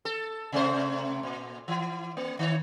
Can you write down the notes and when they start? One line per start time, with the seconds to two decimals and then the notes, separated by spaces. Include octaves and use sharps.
0.05 A4
0.52 C3 A3 C5
1.23 A#2
1.68 E3
2.17 A#3
2.39 D#3 C#5